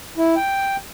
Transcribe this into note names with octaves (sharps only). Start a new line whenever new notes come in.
E4
G5